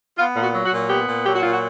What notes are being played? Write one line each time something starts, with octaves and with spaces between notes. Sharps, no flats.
B3 F4
A#2
F#4
F#3
F#4
A#2
B3 G4
A#2
F#3 G4
F#4
A#2 F4
F#4